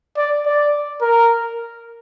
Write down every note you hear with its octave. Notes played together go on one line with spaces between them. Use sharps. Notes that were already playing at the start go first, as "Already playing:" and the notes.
D5
D5
A#4